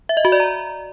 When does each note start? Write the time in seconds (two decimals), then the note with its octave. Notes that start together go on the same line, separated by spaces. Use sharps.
0.09 E5
0.17 D#5
0.25 F#4
0.32 D5
0.40 A#5